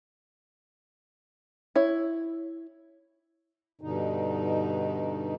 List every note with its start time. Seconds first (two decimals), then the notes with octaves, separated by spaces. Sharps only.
1.75 E4 C#5
3.81 G2 B2 D3 D#4